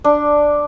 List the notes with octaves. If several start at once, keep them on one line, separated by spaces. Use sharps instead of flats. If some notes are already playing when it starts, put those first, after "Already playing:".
D4